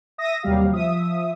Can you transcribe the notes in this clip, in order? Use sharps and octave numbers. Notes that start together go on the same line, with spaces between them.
E5 D#6 A#6
D#2 C3 F#3 G3 G4 F5
F3 E5 D#6